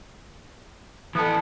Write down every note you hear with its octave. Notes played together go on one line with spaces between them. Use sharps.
E3 B3 A4